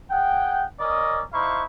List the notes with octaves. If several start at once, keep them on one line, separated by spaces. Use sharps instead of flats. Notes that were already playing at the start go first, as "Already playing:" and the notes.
G#4 F#5 G5
C#4 A#4 D5 D#5
D#4 E4 C5 F5 C#6